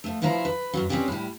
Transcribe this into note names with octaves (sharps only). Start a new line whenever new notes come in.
F3 A3
B2 F3 E4 C5 A#5
B4
F#2 A#2 F#3
C4 C#4 F4 G4 G#4 D5
A2 G3